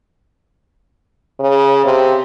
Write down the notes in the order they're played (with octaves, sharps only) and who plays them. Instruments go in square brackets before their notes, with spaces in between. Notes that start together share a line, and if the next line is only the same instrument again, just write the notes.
[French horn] C#3
C3